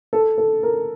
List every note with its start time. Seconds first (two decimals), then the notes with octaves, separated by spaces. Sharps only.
0.13 A4
0.38 A4
0.63 A#4